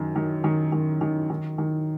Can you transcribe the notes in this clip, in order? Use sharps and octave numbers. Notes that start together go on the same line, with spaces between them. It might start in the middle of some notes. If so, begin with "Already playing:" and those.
Already playing: F#2 D#3
D#3
D#3
D#3
D#3
D#3
D#3